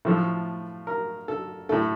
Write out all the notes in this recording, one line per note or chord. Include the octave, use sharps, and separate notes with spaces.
A2 F3 A3 A4
A#4
A4
A2 A3 A4